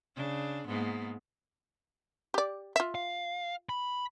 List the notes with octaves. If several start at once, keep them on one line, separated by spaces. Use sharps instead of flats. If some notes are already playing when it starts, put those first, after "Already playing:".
C#3 D4
G#2 A#3 B3
G4 D5
F4 E5
F5
B5